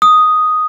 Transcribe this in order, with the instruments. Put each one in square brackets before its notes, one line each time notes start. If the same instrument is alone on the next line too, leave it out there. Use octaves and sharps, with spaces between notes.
[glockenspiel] D#6